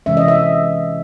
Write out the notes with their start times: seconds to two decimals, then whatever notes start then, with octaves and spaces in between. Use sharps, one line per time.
0.06 C3 E3 G#3 C#4 E5
0.17 D#5
0.28 E5